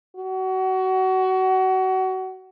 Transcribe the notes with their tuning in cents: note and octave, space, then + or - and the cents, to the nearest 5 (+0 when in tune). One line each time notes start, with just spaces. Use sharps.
F#4 +25